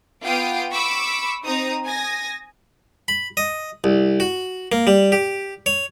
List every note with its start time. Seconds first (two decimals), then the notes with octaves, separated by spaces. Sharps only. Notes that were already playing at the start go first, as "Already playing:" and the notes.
0.24 B3 F4 F5 G5 D6 D#6
0.73 B5 C#6 D6 E6 B6
1.45 C4 D#4 A#5 D#6
1.87 G#5 D#6 A#6
3.08 B5
3.37 D#5
3.84 C2
4.20 F#4
4.72 A#3
4.87 G3
5.12 G4
5.66 C#5